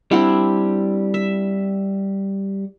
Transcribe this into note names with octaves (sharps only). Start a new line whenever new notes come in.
G3 C4 D4 E4 F#5
E5